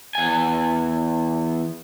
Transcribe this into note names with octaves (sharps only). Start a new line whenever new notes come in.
E2 G#5